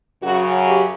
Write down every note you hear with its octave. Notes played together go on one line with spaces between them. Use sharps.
F#2 C#3 F#3 F#4
G4